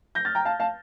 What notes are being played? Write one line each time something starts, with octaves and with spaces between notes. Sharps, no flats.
G6 A#6
F6 A6
G5 A#5
F5 A5
F5 A5